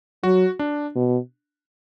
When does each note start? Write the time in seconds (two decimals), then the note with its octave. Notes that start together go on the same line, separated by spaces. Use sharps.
0.23 F#3 F#4
0.59 D4
0.96 B2